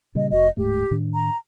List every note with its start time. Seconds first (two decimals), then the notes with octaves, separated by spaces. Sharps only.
0.15 A#2 C#3 G3 D#5
0.32 F1 F#4 D#5
0.57 D1 G#2 A3 G4
0.91 A2 D#3 D4
1.14 A#5